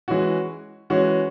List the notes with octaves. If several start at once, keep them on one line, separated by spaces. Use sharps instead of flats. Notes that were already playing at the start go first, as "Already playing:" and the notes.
E3 G#3 C#4 F#4
E3 G#3 C#4 F#4